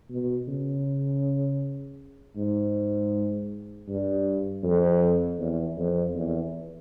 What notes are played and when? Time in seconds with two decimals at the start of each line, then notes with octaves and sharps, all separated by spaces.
0.10 B2
0.48 C#3
2.37 G#2
3.88 G2
4.64 F2
5.40 E2
5.77 F2
6.15 E2